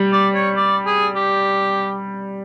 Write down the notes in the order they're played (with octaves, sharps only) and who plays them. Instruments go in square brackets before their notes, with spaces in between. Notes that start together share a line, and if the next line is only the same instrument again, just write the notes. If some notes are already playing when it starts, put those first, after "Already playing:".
Already playing: [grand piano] G3
[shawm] D5
C#5
D5
G#4
G4